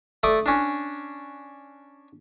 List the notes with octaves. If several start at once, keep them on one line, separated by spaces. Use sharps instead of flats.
A3 D5 D#6
C#4 D4